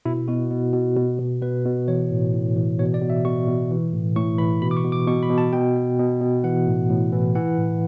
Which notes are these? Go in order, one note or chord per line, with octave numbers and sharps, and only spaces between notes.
B2 E4
B2 F#4
B2
B2
B2
B2
B2 B4
B2
E3 C#5
A2
A2
E3
B2 C#5
D5
B2
E5
B2 C#6
B2
E3
A2
A2 C#6
E3 B5
B2 B5
D6
C#6
B2
D6
B2 C#6
B5
B2
A5
B2 G5
B2
B2
B2
E3 F#5
A2
A2
E3
E3 F#5
A2